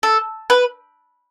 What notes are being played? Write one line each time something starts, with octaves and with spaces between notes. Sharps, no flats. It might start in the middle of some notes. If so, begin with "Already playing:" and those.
A4
B4